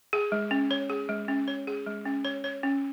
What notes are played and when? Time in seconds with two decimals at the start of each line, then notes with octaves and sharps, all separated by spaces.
0.13 G#4
0.32 G#3
0.51 C#4
0.71 C#5
0.90 G#4
1.09 G#3
1.28 C#4
1.48 C#5
1.67 G#4
1.86 G#3
2.05 C#4
2.25 C#5
2.44 C#5
2.63 C#4